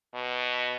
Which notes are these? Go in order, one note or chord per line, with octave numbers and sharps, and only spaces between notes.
B2